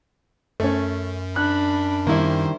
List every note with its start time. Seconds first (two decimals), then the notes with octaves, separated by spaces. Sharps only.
0.60 F#2 A3 C#4
1.36 D4 B5 F#6
2.07 D#3 G3 A#3 E4 C5